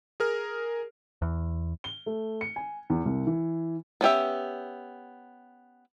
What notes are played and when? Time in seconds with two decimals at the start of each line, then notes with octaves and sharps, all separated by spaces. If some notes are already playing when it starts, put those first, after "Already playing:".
0.20 G#4 A#4 F6
1.22 E2
1.84 G7
2.06 A3
2.41 C#7
2.56 G#5
2.90 E2
3.05 C2
3.27 E3
4.01 B3 C#4 G4 E5